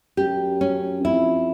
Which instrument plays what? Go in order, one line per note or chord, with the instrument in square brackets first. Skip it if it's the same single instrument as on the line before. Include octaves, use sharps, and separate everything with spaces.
[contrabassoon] F#2 [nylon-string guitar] G4
[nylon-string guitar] C#4
[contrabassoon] F#2
[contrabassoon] F2 [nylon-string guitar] E4